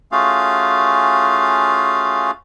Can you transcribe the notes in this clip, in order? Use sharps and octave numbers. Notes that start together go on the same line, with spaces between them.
A3 C#4 F4 F#4 G#4 F5